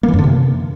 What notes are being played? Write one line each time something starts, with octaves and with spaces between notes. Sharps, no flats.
A#3
E3
F#2
D3
C3